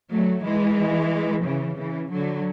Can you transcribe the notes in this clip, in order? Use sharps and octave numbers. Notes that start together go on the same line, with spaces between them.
F#3 A3
E3 G#3
C#3 E3
C#3 E3
D3 F#3